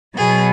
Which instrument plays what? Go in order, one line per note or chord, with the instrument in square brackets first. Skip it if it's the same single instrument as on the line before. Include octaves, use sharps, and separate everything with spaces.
[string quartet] B2 F#3 B3 G#4